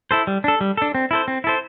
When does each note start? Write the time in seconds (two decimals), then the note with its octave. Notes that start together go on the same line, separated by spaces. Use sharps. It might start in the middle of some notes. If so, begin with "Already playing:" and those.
0.11 E4 A4 C5
0.27 G3
0.44 D4 A4
0.61 G3
0.77 D4 A4
0.95 C4
1.11 E4 A4 C5
1.28 C4
1.44 E4 A4 C5